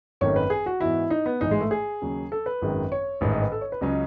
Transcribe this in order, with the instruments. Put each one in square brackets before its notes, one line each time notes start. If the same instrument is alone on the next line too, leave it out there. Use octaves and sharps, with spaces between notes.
[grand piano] G#1 F#2 D#3 A3 C#4 [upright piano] C#5
[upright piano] B4
G#4
F#4
[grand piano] G#2 E3 B3 F#4 [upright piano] E4
[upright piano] D#4
B3
[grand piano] A1 G#2 E3 [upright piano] D#4
[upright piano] G#3
A3
G#4
[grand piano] D#2 C#3 F#3
[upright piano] A4
B4
[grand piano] G#1 F#2 D#3 G#3
[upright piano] C#5
[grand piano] A1 G#2 D#3 [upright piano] B4
[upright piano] D#5
B4
A4
C#5
B4
[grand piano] C#2 C#3 F#3 C#4 [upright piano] D#5